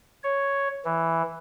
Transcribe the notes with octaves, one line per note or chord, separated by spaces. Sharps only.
C#5
E3